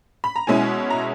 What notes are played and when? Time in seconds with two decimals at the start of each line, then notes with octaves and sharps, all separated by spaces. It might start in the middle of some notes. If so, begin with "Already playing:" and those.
0.24 B5
0.36 A#5
0.47 B2 G#3 C#4 E4 G#5
0.90 A#5